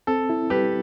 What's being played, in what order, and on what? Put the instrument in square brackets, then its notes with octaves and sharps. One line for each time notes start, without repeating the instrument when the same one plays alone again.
[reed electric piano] C4 [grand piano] A4
[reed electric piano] E4
[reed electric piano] G3 [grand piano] G4 B4